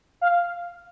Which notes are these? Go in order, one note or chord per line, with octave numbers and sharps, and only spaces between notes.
F5